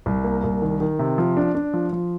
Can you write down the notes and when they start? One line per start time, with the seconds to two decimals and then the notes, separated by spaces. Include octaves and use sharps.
0.06 C2
0.24 A#3
0.44 C2
0.62 D#3
0.80 D#3
0.99 C3
1.18 F3
1.37 D4
1.55 D4
1.74 F3
1.92 F3